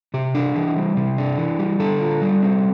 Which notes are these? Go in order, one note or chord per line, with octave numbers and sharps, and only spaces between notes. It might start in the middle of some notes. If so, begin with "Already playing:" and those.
C3 G4
D4
E3
G3
C3
D4
E3
G3
D3 A4
F4
G3
C4